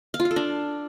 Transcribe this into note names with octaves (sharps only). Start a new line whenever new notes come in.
F5
F4
F5
A4
D4